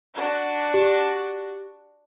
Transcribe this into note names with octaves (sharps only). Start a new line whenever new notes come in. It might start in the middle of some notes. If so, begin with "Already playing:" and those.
D4 F#4
G4